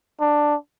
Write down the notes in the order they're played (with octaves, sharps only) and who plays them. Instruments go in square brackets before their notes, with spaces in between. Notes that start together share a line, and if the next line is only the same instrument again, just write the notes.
[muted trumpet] D4